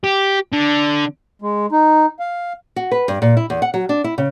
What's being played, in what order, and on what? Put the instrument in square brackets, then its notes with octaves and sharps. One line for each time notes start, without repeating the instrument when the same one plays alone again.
[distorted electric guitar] G4
D3
[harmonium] G#3
D#4
F5
[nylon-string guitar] F#4
B4
G2
A#2
E4
E2
F#5
F#3
D4
E4
C#3